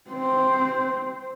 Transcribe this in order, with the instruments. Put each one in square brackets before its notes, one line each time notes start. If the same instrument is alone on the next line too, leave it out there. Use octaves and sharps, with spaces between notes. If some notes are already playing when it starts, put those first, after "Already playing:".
[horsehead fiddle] C4 C5